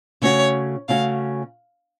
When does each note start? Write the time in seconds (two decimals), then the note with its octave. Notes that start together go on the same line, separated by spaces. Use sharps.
0.22 C#3 A3 C#4 F#4 C#5
0.88 C#3 A3 C#4 F#4 F5